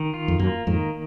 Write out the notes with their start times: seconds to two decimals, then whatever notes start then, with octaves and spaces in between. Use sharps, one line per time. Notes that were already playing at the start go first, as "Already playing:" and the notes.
Already playing: D#3
0.14 F4
0.28 F2
0.39 F#2 A#3
0.67 F2 G#2 D#3